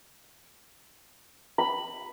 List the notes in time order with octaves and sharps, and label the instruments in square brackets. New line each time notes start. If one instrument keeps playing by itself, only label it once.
[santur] B5